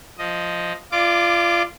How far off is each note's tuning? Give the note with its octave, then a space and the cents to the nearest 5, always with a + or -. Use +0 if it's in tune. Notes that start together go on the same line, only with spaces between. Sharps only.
F3 +0 D#5 +5
F4 -20 D5 +20 D6 +0